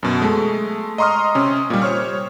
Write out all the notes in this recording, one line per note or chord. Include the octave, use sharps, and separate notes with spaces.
F#2 B2
G#3 A3
D#5 A#5 C6 C#6 D#6 F6
C3 C#4
A#2 G3
C5 C#5 C#6 F6